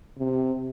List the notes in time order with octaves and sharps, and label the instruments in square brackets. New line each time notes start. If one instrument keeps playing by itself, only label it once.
[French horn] C3